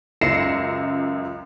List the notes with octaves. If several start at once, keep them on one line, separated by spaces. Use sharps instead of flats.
C#2 F#2 A#6 C7 C#7 E7